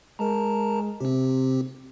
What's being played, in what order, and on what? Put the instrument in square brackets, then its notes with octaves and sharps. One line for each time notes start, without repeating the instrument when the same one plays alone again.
[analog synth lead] G#3 [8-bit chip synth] A#4 A5 A#5
[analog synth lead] C3 [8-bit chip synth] C4 G4